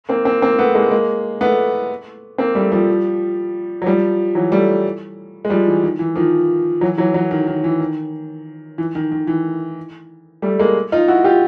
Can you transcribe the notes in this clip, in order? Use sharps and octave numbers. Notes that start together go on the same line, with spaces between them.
A#3 C4
A#3 C4
A#3 C4
A3 B3
G#3 A#3
G#3 A#3
A3 B3
A#3 C4
G3 A3
F3 G3
F#3
F3 G3
E3 F#3
G3 A3
G#3
F3 G3
E3
D#3
E3
D#3 F3
E3 F#3
E3 F#3
E3 F#3
D#3
D#3
E3
D#3
E3
D#3
D#3
E3
G3 A3
G#3 A#3
D#4 F4
E4 F#4
F4 G4